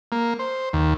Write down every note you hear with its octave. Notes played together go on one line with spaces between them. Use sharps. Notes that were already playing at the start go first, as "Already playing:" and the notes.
A#3
C5
D#2